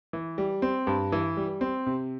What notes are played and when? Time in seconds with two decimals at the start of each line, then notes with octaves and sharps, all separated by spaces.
0.13 E3
0.38 G3
0.62 C4
0.87 G2
1.12 E3
1.37 G3
1.61 C4
1.86 C3